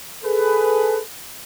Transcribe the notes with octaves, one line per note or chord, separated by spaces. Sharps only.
G#4 A4 B4